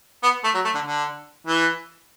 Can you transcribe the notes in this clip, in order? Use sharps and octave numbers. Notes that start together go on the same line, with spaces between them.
B3
A3
F#3
A3
D3
D3
E3